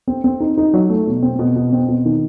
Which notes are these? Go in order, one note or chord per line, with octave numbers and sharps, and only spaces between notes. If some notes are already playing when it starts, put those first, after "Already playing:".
C4
C4
D#4
D#4
F#3
A3
B2
C4
B2
B2
C4
B2
D#3